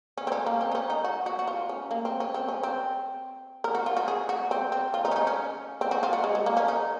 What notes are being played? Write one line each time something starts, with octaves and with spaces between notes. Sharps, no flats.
C#4
C4
C#4
A#3
C4
D#4
C#4
D#4
F#4
F#4
F#4
F4
C#4
A#3
C4
C#4
C4
C#4
C4
A#4
F#4
F4
F#4
G#4
F#4
C4
C4
F4
D#4
C#4
D#4
C#4
C4
F#4
F4
F#4
G#3
G#3
A#3
C#4
D#4